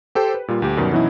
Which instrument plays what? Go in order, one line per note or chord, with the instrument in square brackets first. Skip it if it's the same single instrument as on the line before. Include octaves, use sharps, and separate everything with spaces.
[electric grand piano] G4 A4 C5 G5
B4
A#2 G3 F4
D2 G4
F#2 B2 D#3 G3
B2 E3 F#3 C#4 D#4 E4